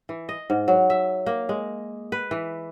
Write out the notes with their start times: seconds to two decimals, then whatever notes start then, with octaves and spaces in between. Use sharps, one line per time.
0.09 E3
0.29 D#5
0.50 G#2
0.68 F#3
0.90 E5
1.26 A#3
1.49 G#3
2.12 B4
2.31 E3